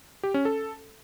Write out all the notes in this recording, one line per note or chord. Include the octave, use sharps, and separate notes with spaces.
G4
C#4
A4